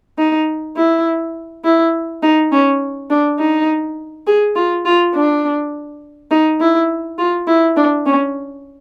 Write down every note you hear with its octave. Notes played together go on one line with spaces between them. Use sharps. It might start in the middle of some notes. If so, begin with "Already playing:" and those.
D#4
E4
E4
D#4
C#4
D4
D#4
G#4
F4
F4
D4
D#4
E4
F4
E4
D4
C#4